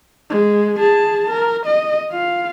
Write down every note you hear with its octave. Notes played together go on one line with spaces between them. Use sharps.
G#3
G#4 A5
A#4
D#5
F4 F5